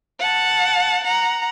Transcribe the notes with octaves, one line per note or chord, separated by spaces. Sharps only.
F#5 A5
F#5 A#5